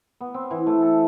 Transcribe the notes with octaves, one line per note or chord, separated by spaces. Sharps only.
B3
C4
E3
A3
A4